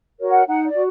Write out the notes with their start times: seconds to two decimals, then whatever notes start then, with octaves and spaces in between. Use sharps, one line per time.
0.20 F#4 A#4 C#5
0.30 F#5
0.47 D#4 F#5
0.65 D5
0.74 F#4